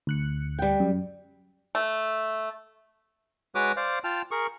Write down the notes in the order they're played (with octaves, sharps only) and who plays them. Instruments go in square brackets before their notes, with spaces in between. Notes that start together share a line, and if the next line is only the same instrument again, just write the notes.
[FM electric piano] D2 F#6 C#7
[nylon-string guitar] G3 G5
[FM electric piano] F#2
[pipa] A3
[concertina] G#3 F#4 B4 C#5 D6 D#6
C5 D5 F5
F4 G5 A5 F6
G#4 A#4 C#6